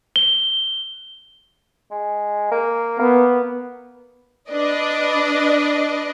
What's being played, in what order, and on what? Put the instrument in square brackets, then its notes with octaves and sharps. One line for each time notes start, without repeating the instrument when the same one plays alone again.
[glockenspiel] G7
[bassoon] G#3
A#3
[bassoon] A#3 [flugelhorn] B3
[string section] D4 B4 D5 D#5